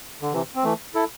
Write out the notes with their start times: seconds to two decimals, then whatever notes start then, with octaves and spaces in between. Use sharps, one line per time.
0.22 D3
0.32 C3 E3
0.55 C4
0.64 E3 A3
0.95 E4 A4